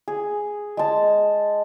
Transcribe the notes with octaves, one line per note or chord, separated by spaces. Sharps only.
G#4
G#3 A5